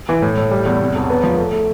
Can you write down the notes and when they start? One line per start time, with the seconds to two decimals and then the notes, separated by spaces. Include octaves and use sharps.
0.09 E3
0.22 A2
0.37 A2
0.51 G3
0.66 E2
0.80 C3
0.95 E1
1.10 B3
1.23 F3
1.38 A3
1.52 A3